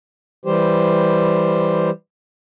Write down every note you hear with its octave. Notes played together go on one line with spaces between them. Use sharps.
E3 G3 G4 C5